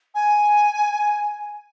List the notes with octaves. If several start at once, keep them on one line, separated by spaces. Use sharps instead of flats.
G#5